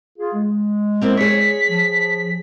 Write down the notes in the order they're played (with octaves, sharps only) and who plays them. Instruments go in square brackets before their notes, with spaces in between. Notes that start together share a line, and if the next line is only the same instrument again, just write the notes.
[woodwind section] F4 G#4
G#3
[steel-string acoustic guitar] A#3 C4 E4
[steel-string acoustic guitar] G#4 C#5 [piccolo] B6
[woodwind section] F3